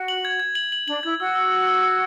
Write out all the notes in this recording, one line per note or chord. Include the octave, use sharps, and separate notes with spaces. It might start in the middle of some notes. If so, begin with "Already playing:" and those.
Already playing: F#4
F#7
G#6
G#6
F#7
F#7
D4 F#7
E4 G#6
F#4 E6
E6
E6
E6
E6